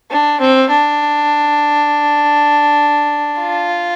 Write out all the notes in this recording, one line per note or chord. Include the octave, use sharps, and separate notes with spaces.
D4
C4
D4
F4